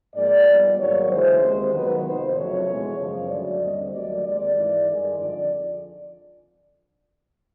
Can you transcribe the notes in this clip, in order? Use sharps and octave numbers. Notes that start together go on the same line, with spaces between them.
G#2 F3 A#3 D5
A#2 G3 B3
G#2 D#3 F#3 A#3 C#5
D2 C#3 E3 G#3 C5
D#2 D#3 G#3 C4
F2 C3 D#3 F#3 B3 B4
F2 C3 D#3 C5
F2 C#3 F#3 A3 C#5
E2 B2 G#3
F#2 C#3 F3
G2 D3 F#3 A3 D5
D#2 D3 G3 C4 D#5
D#2 D#3 F#3 A3 D5
D#2 D#3 G#3 C4 D5
G#2 E3 G#3
G2 D#3 G#3
F2 D3 F3 D5